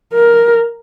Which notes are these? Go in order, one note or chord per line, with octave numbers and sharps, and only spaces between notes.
A#4